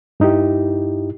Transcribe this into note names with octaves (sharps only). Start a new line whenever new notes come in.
G2 D#4 E4 G4